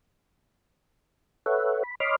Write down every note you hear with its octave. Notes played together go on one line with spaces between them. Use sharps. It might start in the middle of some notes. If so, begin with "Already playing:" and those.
A4 B4 C#5 E5 F#5
B5
C#5 D#5 B5 C6 D6 F6